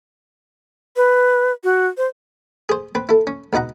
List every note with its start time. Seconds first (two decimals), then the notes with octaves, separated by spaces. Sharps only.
0.96 B4
1.64 F#4
1.97 C5
2.69 G#4 C5
2.95 C4 B4
3.09 E4 A4
3.27 C#4
3.53 C#2 B2 D#4 F#5 A#5